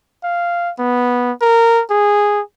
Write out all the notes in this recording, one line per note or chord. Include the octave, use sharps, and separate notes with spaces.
F5
B3
A#4
G#4